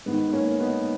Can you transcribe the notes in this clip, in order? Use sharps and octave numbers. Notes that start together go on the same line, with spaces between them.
G#2 D#3 B3
A#3 C#4
B3 D#4